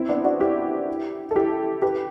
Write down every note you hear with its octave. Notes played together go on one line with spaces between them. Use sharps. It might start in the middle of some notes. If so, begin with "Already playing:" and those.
Already playing: C4 E4
B3 D4
D4 F#4
E4 G4
A4
E4 G4
G4 B4